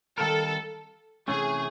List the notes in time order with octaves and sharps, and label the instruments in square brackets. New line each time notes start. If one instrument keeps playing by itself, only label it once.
[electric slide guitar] D#3 G3 C4 F4 A#4 [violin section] A4
[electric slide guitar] C3 E3 A3 C#4 [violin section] G#4